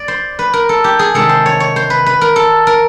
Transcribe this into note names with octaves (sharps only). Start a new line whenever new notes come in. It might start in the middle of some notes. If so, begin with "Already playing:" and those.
Already playing: D5
C5
B4
A#4
A4
G4
G#4
C3 D#3 G#3 C4 A4
C5
C#5
C#5
C5
B4
B4
A#4
A4
A#4